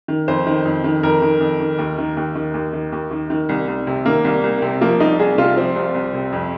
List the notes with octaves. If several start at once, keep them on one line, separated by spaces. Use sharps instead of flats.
D#3
F2 C5
D#3
F2
D#3
F2 A#4
D#3
F2
D#3
D#2
D#3
D#2
D#3
D#2
D#3
D#2
D#3
D#3
C2
C2
C3
D#3 A#3
C2
C2
C3
F3 A#3
C2 D#4
C2 G#4
C3 F4
F3 C4
C2
C2
C3
F2